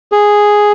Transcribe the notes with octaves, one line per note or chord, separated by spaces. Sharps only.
G#4